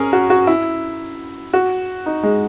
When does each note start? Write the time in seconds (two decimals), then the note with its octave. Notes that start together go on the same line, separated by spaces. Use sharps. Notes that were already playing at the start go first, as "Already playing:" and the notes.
Already playing: C#4 G#4 A#4
0.13 F#4
0.30 F#4
0.47 E4
1.53 F#4
2.06 D#4
2.23 G#3